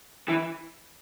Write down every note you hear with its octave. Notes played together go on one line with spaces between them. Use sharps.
E3